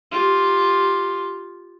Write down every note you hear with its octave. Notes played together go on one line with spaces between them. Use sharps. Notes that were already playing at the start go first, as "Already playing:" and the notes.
F4 G4